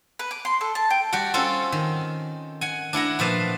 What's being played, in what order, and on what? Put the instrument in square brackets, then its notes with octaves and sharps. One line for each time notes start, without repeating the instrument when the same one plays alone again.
[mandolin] B4
D6
C6
A4
A5
G5
[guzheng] G3 F#4 F#5 G5
C4 C#4 F4 A4
D#3
F#5 G#5
D4 E4 F#5 A#5
A#2 F3 B4 F5 A5